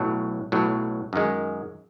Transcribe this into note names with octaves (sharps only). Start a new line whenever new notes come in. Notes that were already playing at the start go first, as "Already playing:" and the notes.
Already playing: B1 A2 F#3
B1 A2 F#3
F#2 D#3 G#3